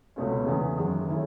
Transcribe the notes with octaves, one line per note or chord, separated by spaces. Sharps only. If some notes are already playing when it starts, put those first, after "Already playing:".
C#2 B2 A3 C#4
E2 C#3 E3
F#2 D#3 G#3
D#3 A3 C#4 E4